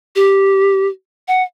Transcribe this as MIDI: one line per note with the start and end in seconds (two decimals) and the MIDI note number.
0.16 0.88 67
1.28 1.43 78